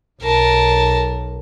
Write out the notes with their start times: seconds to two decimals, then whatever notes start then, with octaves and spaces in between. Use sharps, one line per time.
0.23 B1 A#4 A5